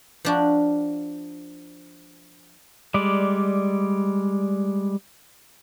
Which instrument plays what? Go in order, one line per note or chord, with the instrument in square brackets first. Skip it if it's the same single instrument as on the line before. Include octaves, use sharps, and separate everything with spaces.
[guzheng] F3 D4 F#4
[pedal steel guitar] G3 G#3 D5